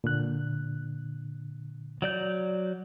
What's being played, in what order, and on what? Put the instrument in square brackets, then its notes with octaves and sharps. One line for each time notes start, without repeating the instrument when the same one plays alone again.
[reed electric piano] A#2 D3 F#6
[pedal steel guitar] F#3 D5 G6